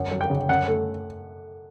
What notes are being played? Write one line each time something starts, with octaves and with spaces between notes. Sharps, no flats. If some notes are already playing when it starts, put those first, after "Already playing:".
Already playing: F#2
F#3
G5
C#3
F#2 F#5
A3